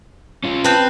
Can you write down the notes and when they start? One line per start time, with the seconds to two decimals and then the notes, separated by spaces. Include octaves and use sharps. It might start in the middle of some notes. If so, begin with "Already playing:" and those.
0.44 C#4 F4
0.64 C4 B4 A5